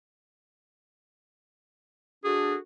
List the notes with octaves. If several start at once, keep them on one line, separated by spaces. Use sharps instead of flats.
D4 F#4 G#4 A4